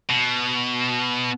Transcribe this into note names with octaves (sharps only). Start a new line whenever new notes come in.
B2